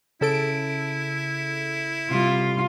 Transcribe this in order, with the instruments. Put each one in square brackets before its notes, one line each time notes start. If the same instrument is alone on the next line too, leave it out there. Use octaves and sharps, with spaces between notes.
[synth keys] C#3 A4 D7 [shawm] E4
[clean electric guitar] C3 G3 [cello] F4